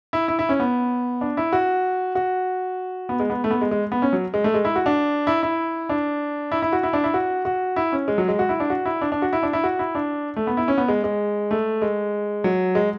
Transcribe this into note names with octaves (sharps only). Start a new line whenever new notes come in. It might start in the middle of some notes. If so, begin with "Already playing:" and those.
E4
E4
E4
C#4
B3
D4
E4
F#4
F#4
B3
G#3
B3
A3
B3
G#3
G#3
B3
C#4
F#3
G#3
A3
G#3
E4
F#4
D4
E4
E4
D4
E4
E4
F#4
E4
D4
E4
F#4
F#4
E4
C#4
G#3
F#3
G#3
F#4
E4
D4
F#4
E4
D4
D4
F#4
E4
D4
E4
F#4
E4
D4
A3
B3
E4
C#4
B3
G#3
G#3
A3
G#3
F#3
G#3